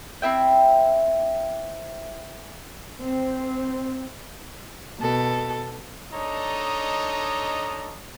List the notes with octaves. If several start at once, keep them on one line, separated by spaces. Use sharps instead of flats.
C4 E4 E5 G5
C4
B2 A4
D4 D#4 A4 C#5 D#5 A#5